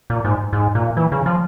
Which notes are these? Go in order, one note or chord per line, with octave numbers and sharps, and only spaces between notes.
A#2
G#2
G#2
A#2
E3
C#3
F3